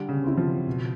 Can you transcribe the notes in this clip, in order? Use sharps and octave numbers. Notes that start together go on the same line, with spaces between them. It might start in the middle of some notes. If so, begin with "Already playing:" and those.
Already playing: D3 G3
C#3
C4 E4
F3
B2